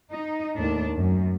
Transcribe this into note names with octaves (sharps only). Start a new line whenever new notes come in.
D#4
D#2 A2 D4
F#2